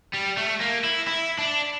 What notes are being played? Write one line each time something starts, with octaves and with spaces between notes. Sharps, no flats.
G3
A3
A#3
E4
E4
D4